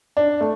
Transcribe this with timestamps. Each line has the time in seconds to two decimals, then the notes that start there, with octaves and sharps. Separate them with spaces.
0.17 D4
0.41 A3